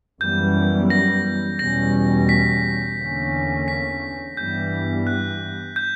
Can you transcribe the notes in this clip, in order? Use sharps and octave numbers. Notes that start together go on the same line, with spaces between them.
F#2 E3 G3 B3 G6
A#6
E2 B2 G3 C#4 A#6
B6
E2 D3 A#3 C#4
B6
G2 E3 G3 B3 G6
F#6
G6